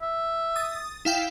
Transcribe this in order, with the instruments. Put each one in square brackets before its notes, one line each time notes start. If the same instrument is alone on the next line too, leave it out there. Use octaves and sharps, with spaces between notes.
[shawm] E5
[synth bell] D#6 A6
E4 F5 G5